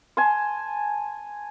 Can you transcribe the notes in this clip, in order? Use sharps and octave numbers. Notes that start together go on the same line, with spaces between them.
G#5 A5 C6